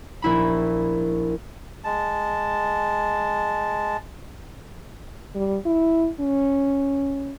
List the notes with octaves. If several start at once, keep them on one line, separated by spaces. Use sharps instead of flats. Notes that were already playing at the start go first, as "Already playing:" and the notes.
A#1 E4 B5
G#3 A5
G3
E4
C#4